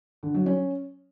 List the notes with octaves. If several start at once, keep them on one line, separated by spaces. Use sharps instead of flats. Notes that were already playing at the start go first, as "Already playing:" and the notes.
D3
F#3
C#4